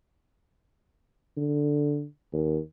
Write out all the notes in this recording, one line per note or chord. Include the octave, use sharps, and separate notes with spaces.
D3
D#2